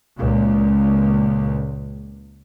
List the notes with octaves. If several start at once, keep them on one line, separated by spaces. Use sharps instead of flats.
C#2 A#2